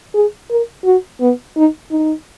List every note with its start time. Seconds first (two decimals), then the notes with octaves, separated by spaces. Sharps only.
0.14 G#4
0.50 A#4
0.85 F#4
1.20 B3
1.56 D#4
1.91 D#4